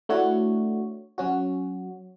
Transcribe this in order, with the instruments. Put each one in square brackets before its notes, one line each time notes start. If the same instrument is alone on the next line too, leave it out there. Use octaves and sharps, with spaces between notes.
[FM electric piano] A3 D4 E4 F#4 C#5
F#3 C#4 F#4